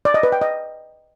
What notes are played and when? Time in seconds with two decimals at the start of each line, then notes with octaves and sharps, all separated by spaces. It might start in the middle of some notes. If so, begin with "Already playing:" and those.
0.05 D5
0.14 D#5
0.23 B4
0.32 G5
0.41 D#5